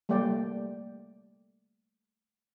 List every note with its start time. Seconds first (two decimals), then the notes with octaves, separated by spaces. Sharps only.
0.09 G3 A3 A#3 D5 G5